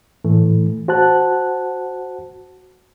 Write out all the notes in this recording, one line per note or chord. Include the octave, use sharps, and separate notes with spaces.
A2 E3 A3
F#4 C5 F#5 A5 F#6